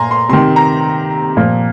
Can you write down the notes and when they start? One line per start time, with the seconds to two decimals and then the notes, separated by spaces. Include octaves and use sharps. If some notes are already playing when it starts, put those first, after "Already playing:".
Already playing: A#2 G#5 A#5 C6
0.11 C6
0.29 C3 D#3 C6
0.56 A#5
1.37 A#2 F3